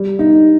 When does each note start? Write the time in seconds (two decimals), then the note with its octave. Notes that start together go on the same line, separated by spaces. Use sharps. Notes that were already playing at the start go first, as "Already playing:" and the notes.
Already playing: G3
0.19 D#4